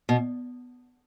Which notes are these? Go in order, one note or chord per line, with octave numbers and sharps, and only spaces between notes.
B2